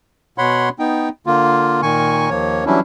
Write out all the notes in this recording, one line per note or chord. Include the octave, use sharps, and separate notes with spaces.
B2 C#5 F#5 B5 C6
B3 D#4 G5
D3 A#3 F4
A#2 D#3 G#5 C#6
D#2 F3 A#3 C#5
E3 F#3 G3 C#4 D4 E4